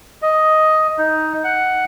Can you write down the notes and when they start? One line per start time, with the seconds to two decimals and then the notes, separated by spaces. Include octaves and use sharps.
0.22 D#5
0.98 D#4
1.44 F#5